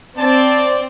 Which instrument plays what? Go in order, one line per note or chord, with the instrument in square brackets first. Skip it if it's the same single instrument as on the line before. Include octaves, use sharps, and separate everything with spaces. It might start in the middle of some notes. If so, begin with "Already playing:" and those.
[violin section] C4 [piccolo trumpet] D5 [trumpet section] A5